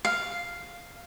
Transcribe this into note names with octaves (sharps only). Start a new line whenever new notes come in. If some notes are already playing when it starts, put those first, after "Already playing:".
F5